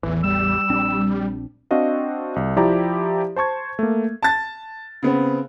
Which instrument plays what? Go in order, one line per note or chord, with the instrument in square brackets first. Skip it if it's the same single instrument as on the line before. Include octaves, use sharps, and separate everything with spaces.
[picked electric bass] A1 E2 [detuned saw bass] E3
[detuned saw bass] G3 [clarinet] E6
[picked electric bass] A#1 C4 D4
[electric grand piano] C4 D4 F#4 D#5 F5
C2
F3 E4 G4 D5 A#5
C5 A5 C#6 G#6
A3 A#3
[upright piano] A5 A6
C#3 B3 C4